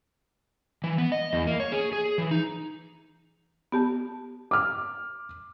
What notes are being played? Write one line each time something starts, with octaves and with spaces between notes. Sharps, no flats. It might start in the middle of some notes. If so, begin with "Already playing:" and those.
E3
B3
D#5
E2
A#3
C#5
G#4
G#4
G#4
E3
D#4
B3 G4 A5
D6 F6